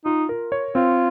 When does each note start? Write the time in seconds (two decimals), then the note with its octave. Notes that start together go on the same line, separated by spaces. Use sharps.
0.05 D#4 F4
0.29 A#4
0.52 C#5
0.75 C4 F4